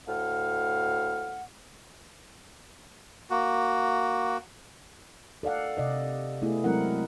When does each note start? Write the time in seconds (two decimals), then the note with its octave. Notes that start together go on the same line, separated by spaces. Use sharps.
0.07 D2 A2 F5 F#5
3.30 A#3 F#4
5.43 A4 D5 F5 F#5
5.77 C3 D5 D#5
6.42 A3 B3 E4 G#4
6.64 F#3 G#3 C4 E4 A#4 F#5